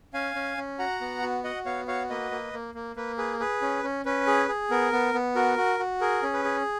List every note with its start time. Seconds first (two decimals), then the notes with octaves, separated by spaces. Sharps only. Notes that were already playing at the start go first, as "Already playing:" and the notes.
0.14 C#4 F5 G#5
0.35 C#4
0.57 C#4
0.79 F#4 F#5 A#5
1.01 B3
1.22 F#4
1.44 F#4 D#5 F#5
1.65 B3 C#5 F5
1.88 F#4 C#5 F5
2.09 A#3 B4 D#5
2.31 A#3
2.53 A#3
2.75 A#3
2.96 A#3 B4
3.18 G#4 B4
3.40 G#4 B4
3.62 C#4
3.83 C#4
4.05 C#4 B4
4.27 G#4
4.48 G#4
4.70 B3 A#4
4.92 B3
5.14 B3
5.35 F#4 A#4
5.57 F#4
5.79 F#4
6.01 G#4 A#4
6.23 C#4
6.34 B4
6.45 G#4